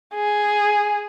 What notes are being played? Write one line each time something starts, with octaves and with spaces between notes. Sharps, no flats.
G#4